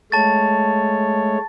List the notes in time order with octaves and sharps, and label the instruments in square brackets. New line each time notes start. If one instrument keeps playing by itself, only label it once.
[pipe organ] G#3 A3 C#5 [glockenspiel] A5 A6